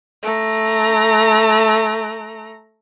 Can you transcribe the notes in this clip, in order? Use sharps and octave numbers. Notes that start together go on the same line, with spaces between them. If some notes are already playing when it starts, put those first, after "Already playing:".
A3 A#5